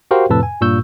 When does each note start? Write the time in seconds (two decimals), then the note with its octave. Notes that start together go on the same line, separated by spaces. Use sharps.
0.11 F#4 G4 A#4 C5 F5 G5
0.30 F2 A2 C3 B4 A5 E6
0.43 G#5
0.61 G2 A#2 C#6 E6 G6